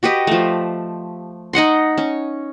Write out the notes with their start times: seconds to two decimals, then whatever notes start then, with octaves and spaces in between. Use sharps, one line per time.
0.03 F#4 G4 B4 D#5
0.27 F3 A3
1.53 D#4 D#5 F#5 C6
1.98 C#4